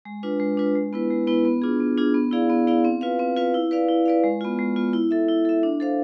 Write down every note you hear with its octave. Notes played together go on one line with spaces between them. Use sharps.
G#3
D4 F4 B4
G#3
D4 F4 B4
G#3
B3 E4 B4
G#3
B3 E4 B4
B3
D4 F4 G#4
B3
D4 F4 G#4
B3
E4 G#4 D5 F5
B3
E4 G#4 D5 F5
C4
F4 B4 F5
C4
F4 B4 F5
E4
B4 D5 F5
E4
B4 D5 F5
G#3
B3 F4
G#3
B3 F4
E4
A4 E5
E4
A4 E5
D4
A4 C5 F5